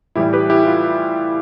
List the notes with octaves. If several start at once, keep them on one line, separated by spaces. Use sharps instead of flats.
A2 E3 G3 E4 G4
G4 B4
E4 G4
F4